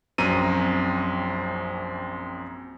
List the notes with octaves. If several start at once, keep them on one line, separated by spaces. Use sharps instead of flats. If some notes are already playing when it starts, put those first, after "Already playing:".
A#1 F#2 C4 A#5 D#7